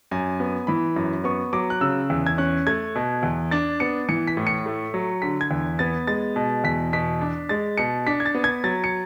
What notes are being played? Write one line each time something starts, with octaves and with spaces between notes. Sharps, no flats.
F#2 G#5
B3
E3 B5
F#2
B3 C#6
F#3 D6
F#6
C#3 E6
E2
G#6
C#4 F#6
A3 G#6
B2
E2
D4 A6
B3 C#7
E3 C#7
B6
A2
C#7
A3
F#3
D3 B6
G#6
E2
B3 A6
G#3 A6
B2
E2 B6
B2 B6
D4
G#3 A6
B2 C#7
D4 B6
G#6
A6
B3
G#6
F#3 A6
C#7